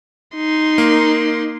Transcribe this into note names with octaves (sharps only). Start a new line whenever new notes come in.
D#4 C6
A#3